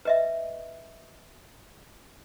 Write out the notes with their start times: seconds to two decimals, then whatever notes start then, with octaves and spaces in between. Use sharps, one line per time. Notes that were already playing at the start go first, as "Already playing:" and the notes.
0.05 B4 D#5 E5